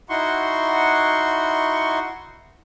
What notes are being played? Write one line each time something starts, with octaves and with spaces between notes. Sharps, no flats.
D#4 E4 F#4 F#5 C6 C#6